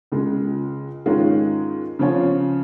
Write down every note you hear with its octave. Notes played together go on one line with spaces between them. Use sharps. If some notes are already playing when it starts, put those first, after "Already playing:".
C#2 C#3 G#3
G#2 D#3 G#3 C#4 F4
C#3 F3 C#4 F4